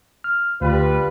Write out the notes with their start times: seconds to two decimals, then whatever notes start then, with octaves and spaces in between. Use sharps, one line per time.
0.24 F6
0.61 D2 G3 F4 B4